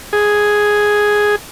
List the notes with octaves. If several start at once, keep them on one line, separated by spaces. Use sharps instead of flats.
G#4